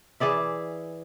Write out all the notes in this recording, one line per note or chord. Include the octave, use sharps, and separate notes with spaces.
E3 G#4 D5 E5